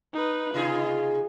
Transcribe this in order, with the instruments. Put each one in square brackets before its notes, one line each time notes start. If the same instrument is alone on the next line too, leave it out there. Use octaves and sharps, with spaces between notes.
[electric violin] D#4 B4
[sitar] C3 D#4 G#4 [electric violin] F4